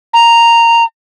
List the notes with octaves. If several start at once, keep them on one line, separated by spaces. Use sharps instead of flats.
A#5